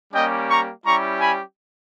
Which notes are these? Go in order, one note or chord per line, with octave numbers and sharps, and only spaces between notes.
G3 A#3 C#4 G4 D#5 G5
A#5 C#6
G3 C#4 E4 G4 A#5 C#6
G#5 B5